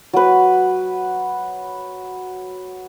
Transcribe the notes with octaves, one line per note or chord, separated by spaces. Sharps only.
F#3 B4